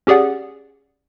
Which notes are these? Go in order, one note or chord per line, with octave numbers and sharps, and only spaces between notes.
C#4 G4 G#4 D5 F#5